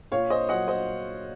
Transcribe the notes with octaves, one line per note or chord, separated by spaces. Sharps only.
A#2 C#5 F5
C5 D#5
F#3 D#5 F#5
C5 D#5